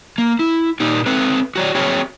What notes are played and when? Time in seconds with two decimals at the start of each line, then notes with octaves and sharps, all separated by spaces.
0.18 A#3
0.39 E4
0.80 A#2 D#4 G4
1.06 C4 A4 B4
1.56 F#4 C#5 D5
1.75 C4 F#4 G#4 C#5 E5 G5